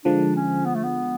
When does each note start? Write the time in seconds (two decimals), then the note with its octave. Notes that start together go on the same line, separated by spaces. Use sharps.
0.05 D3 F3 G#3 D4
0.36 C#4
0.66 B3
0.75 A3
0.84 B3